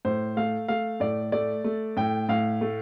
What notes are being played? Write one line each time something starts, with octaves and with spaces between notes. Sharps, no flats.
A2 C5
A3 F5
A3 F5
A2 D5
A3 D5
A3
A2 G5
A2 F5
A3